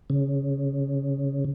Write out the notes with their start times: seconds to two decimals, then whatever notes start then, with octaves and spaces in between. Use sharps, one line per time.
0.10 C#3